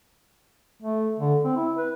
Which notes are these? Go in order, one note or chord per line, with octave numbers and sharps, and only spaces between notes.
A3
D3
C4
E4
B4